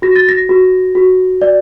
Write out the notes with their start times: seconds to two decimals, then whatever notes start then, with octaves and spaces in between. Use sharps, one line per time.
0.02 F#4 A#6
0.16 A6
0.29 A#6
0.49 F#4
0.95 F#4
1.42 D5